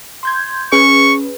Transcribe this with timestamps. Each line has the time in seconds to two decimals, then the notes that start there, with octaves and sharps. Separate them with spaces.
0.23 C6 G6 G#6
0.72 C#4 G#4 B4 C#6